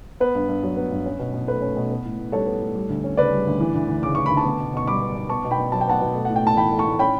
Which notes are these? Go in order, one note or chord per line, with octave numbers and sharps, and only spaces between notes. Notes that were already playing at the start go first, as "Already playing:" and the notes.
B3 B4
G2
G2
F#3
B3
G2
C#4
B2
B2
A3 B4
C#4
B2
B3
A2
A2
G3 A4 C#5
B3
A2
G3
D2
C#4
C#3 B4 D5
G3
D2
E3
D2
D2
C#3 D6
E3 C#6
B5
D2
A5 C#6
B3
B2
B2 C#6
G3 B5 D6
B3
B2
B3 A5 C#6
B2
G5 B5
B2
F#3 A5
G5
B3 F#5 A5
B2
A3
A2 F#5
G5
A2 A5
E3 G5 B5
A3
A5 C#6
A2
C#4 G5 B5